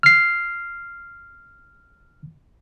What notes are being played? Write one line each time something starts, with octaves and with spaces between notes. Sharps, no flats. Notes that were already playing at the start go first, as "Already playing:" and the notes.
F6 C7